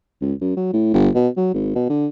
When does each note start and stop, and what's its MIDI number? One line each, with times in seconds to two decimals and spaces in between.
0.21 0.33 37
0.41 0.55 42
0.56 0.71 54
0.73 0.89 45
0.94 1.09 31
1.15 1.28 47
1.37 1.49 54
1.54 1.71 32
1.75 1.86 47
1.89 2.07 50